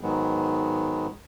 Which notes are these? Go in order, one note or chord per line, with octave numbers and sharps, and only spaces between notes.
G#2 D#3 F#3 G#3 B3